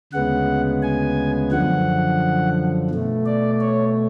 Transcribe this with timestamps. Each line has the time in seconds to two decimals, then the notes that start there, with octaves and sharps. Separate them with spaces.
0.13 D2 C#3 G#3 B3 F#5
0.82 G#5
1.51 F#2 D3 F3 F#5
2.91 B2 A3
3.26 D5
3.60 C#5